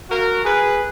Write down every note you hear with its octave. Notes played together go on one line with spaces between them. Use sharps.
F#4 A#4
G#4 B4